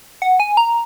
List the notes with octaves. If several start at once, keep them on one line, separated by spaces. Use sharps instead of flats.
F#5
G#5
A#5